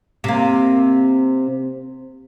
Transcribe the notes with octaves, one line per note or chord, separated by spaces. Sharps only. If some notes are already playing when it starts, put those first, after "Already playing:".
C3 A#3